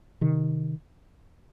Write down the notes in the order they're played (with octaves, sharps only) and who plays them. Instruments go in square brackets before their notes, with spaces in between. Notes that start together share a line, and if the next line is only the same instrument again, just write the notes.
[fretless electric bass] C3 D#3